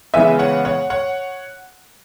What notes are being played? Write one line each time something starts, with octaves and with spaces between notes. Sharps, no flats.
C#3 E3 G#3 B3 E5 G#5
C#5 F#5
C#5 F#5
C#5 F#5